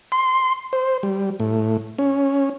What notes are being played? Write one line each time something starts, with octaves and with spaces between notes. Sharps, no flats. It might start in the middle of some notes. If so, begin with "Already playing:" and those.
C6
C5
G3
A2
C#4